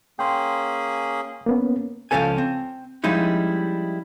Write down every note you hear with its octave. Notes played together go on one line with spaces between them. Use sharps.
A#3 C#4 G#4 G5 C6
A#3 B3 C#4
C#2 E3 F3 C#4 A4 G#5
C4
F3 G3 G#3 C#4 D#4 E4